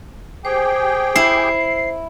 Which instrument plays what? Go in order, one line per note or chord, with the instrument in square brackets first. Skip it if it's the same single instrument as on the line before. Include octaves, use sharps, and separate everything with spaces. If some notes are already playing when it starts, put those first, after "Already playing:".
[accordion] G4 G#4 G5 [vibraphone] C5
[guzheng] E4 [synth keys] C7